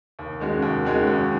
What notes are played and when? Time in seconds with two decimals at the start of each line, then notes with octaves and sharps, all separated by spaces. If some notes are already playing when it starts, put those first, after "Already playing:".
0.19 D#2
0.40 D#3 G#3 C#4 F#4
0.62 D#2
0.85 D#3 G#3 C#4 F#4
1.07 D#2